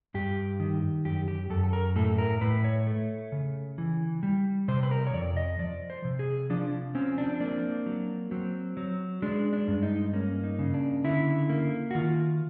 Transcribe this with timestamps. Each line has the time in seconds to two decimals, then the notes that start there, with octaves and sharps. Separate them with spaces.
0.14 G2 G4
0.60 D#3
1.05 F#2 G4
1.28 G4
1.50 F#2 A4
1.64 A4
1.73 A#4
1.96 A2 A4
2.18 A#4
2.41 A2 B4
2.64 C#5
2.87 A3
3.32 C#3
3.78 E3
4.23 G3
4.68 C3 C5
4.83 B4
4.91 A#4
5.07 C#5
5.13 F2 D5
5.37 D#5
5.59 F3 D5
5.90 C5
6.05 C3
6.19 G#4
6.50 F3 D4
6.95 C4 C#4
7.18 D4
7.40 A#3 D4
7.86 F#3
8.31 F#3 C4
8.77 F#3
9.22 G#3 D4
9.53 D4
9.68 G2
9.83 D#4
10.13 A#3 C#4
10.44 D#4
10.59 C#3
10.74 D4
11.04 D3 E4
11.50 A#3
11.91 F#4
11.95 D#3 F4